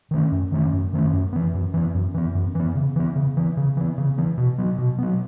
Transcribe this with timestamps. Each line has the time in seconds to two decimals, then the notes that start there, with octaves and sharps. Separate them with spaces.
0.11 D#3 A3 C#4
0.32 F#2
0.52 D#3 A3 C#4
0.73 F#2
0.93 D#3 A3 C#4
1.13 F#2
1.33 E3 B3
1.54 F#2
1.74 E3 B3
1.95 F#2
2.14 E3 B3
2.35 F#2
2.55 E3 B3
2.75 C#3
2.96 E3 B3
3.15 C#3
3.37 E3 B3
3.57 C#3
3.77 E3 B3
3.98 C#3
4.18 E3 B3
4.38 B2
4.58 F#3 B3
4.78 B2
4.98 F#3 B3